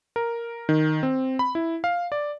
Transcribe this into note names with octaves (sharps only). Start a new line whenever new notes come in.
A#4
D#3
C4
B5
E4
F5
D5